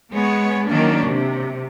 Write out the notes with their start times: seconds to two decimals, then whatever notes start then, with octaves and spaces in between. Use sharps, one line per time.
0.12 G#3 B3 C#5
0.67 D#3 F#3 A#3 C#4 D4
1.06 C3